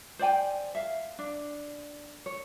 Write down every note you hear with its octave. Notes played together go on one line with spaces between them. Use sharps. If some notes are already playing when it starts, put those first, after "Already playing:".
C5 D5 G5 G#5
E5 F5
D4
C#5